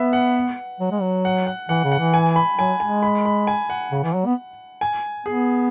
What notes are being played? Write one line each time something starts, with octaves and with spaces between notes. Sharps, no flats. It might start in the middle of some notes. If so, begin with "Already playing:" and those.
Already playing: B3 B4 E5
F#5
F#3
G#3
F#3
F#5
F#5
E3 F#5
C#3
F#5
E3
G#5
B5
F#3 G#5
G#3 G#5
B5
B5
G#5
F#5
C#3
E3
F#3
B3
G#5
B3 G#4